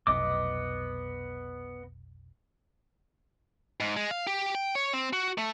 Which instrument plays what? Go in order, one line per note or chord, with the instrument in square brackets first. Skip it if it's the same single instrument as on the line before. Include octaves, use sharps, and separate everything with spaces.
[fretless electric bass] F1 B1 [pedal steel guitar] B3 D#5 D6
[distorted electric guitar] G#2
G#3
F5
G4
G5
C#5
C4
F#4
A3